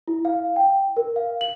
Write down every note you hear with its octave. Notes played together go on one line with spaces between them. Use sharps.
E4
F5
G5
A#4
F5
F#7